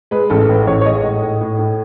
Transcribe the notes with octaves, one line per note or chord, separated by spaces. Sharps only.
G#3 B4
A1 A4
A2 B4
A1 C#5
C#5
G#3 D#5
A2 D#5
A2
A2
A2